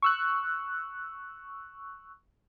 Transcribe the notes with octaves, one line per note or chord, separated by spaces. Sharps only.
C#6 E6 F#6